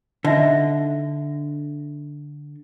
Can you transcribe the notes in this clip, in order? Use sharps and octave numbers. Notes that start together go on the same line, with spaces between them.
D3 D#4 D#5 E5